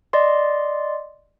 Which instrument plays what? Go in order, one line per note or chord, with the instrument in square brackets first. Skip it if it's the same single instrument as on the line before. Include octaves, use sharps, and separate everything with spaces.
[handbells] D5 D#5 C6